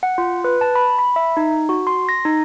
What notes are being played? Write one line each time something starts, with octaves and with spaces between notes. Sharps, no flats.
F#5
F4
B4
A5
B5
B5
E5
D#4
F#4
C6
A#6
D#4